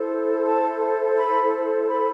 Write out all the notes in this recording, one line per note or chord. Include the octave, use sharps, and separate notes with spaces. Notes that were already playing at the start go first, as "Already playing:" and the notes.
Already playing: E4 A4 C5
A5
B5
B5